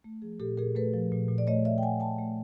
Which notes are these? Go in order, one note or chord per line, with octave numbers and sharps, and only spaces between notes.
A3
F3 G#4
A#2 G4 A4
A#2 G#4 A#4
A3 A4 B4
F3
A#2
A#2
D5
A3 C#5 D#5
F3 D5 E5
G5
A#2 F#5 G#5
A#2 G5 A5
A3